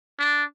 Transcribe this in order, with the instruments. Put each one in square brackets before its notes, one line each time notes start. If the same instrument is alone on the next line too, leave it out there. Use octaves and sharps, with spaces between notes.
[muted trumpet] D4